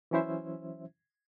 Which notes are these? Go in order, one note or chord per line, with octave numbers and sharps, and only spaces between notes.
E3 F#3 C#4 E4 C5 E5